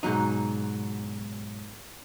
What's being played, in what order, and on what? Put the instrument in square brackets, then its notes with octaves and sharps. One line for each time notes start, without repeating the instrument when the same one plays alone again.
[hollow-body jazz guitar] G#2 B2 F#3 D#4